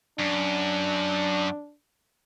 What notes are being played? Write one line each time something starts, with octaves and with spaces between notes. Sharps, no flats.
F#2 D4